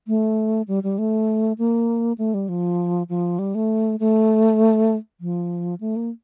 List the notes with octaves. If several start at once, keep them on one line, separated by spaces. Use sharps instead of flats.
A3
G3
G3
A3
A#3
A3
G3
F3
F3
G3
A3
A3
F3
A3
A#3